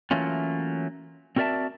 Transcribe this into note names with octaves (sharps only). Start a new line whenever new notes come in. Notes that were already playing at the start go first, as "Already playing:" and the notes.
E3 F#3 A3 A#3 C#4 F4
C4 F#4 A#4 D5 E5 A5